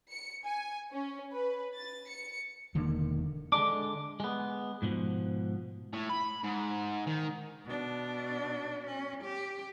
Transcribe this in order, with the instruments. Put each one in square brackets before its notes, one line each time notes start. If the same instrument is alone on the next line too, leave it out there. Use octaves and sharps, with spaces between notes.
[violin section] C#7
G#5
C#4
B4
A6
C#7
[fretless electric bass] E1 D3 D#3 A#3
[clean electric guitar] D3 G#3 D4 [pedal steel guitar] D6
[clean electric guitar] G#3 B3
G#2 B2 F3
[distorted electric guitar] A2
B5
G#2
D#3
[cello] B2 D4
C#4
G4